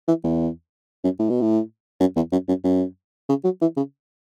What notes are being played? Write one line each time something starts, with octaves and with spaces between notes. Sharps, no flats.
E3
E2
F#2
A2
B2
A2
F#2
E2
F#2
F#2
F#2
C#3
F#3
E3
C#3